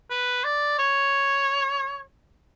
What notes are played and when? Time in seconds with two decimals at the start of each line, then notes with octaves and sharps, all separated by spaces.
0.10 B4
0.44 D5
0.79 C#5